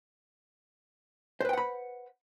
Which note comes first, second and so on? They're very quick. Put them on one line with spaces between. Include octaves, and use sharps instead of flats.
C5 B4 G5 F#5 B5